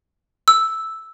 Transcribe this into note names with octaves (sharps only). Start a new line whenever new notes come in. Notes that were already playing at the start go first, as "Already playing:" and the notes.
E6